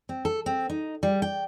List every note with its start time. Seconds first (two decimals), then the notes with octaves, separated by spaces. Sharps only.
0.09 C4
0.25 A4
0.46 C4
0.70 D#4
1.03 G3
1.22 G5